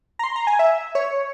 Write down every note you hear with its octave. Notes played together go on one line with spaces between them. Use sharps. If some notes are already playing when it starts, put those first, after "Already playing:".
A#5
C6
A#5
G#5
E5
C#5